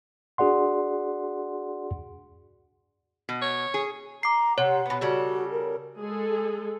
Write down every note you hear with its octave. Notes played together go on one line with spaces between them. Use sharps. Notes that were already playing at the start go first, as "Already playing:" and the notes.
D4 F#4 G#4 D5 F#5 C6
B2
C#5
G#4
A#5 D6 C7
C3 C#5 F#5
B2 B3
C#3 G3 F#4 A4
A#4
G#3 G#4 A4